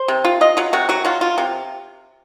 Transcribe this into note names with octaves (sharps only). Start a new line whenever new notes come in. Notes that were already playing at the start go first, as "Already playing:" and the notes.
Already playing: C5
C3
F4
F4 D#5
F#3 F4
C3 F#4
F#3 F#4
F#3 F4
F4
C3